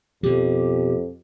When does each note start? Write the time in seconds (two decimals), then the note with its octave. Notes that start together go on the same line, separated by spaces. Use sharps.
0.23 F2 B2 F3 G4